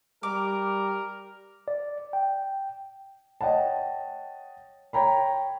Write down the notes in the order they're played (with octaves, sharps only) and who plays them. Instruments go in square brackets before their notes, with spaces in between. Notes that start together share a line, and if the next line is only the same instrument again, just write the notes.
[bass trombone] G3 [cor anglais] A#4 [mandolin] D6
[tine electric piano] D5
G5
[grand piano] C#5 D#5 F#5 G5 A5
C#5 G5 A#5 B5